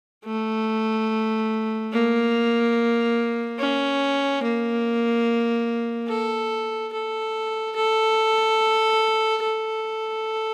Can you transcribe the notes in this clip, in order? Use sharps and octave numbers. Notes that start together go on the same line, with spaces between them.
A3
A#3
C#4
A#3
A4
A4
A4
A4